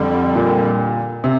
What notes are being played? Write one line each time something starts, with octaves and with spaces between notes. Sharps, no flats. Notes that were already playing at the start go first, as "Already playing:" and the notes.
Already playing: F2 D3 G3
A#2
C3